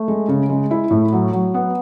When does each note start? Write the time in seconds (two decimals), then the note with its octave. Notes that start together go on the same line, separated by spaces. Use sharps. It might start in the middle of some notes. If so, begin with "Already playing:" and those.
Already playing: A3
0.08 G#3
0.28 C#3
0.49 G#3
0.71 E4
0.90 A2
1.12 F#3
1.32 F#3
1.54 B3